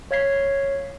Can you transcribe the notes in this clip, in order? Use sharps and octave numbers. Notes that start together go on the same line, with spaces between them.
C#5 F5 G#6 B6 C7